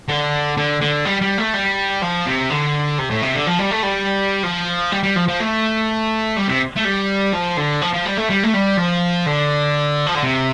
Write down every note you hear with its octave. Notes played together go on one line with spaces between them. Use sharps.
D3
D3
D3
G3
G3
A3
G3
F3
C3
D3
C3
A2
C3
D3
F3
G3
A3
G3
F3
G3
G3
F3
F3
A3
G3
C3
A3
G3
F3
D3
F3
F3
G3
A3
G3
A3
G3
F3
D3
F3
D3
C3